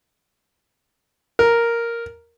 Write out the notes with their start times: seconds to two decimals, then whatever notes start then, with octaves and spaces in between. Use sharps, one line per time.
1.39 A#4